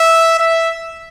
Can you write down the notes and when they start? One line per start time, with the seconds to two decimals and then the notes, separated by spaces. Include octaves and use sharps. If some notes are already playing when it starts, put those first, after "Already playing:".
Already playing: E5
0.39 E5